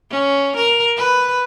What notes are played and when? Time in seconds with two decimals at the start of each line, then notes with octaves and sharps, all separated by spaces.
0.10 C#4
0.57 A#4
0.97 B4